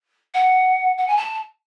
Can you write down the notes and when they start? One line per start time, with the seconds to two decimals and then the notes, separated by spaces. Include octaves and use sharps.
0.34 F#5
0.98 F#5
1.07 G#5
1.17 A5